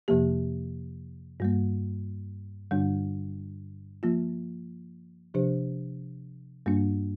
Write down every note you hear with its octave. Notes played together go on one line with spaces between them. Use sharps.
F2 C3 F3 A#3 G4
G2 G3 A#3
G2 D3 G3 D4
F3 A#3 F4
C3 F3 D4 G4 C5
G2 G3 A#3 D4